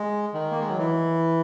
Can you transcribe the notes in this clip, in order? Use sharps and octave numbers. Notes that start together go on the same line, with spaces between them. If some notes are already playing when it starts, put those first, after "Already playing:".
Already playing: G#3
D#3
A#3
G#3
F#3
E3